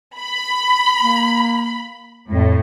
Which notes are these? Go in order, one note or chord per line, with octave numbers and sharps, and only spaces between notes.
B5
A#3
F2 A2